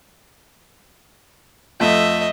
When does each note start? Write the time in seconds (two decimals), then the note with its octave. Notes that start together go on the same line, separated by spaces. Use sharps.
1.80 F2 A3 D#5 E5